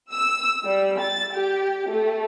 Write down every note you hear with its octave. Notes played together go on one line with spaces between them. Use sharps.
E6
G3
A6
G4
A3